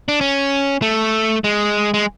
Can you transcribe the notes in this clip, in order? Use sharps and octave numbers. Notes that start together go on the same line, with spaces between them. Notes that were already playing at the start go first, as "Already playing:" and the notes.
D4
C#4
A3
G#3
G#3